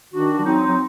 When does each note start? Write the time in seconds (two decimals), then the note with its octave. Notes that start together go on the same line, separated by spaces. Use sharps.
0.14 D#3 D4 F#4
0.39 G3
0.45 F#3 C4 D#4
0.68 F#3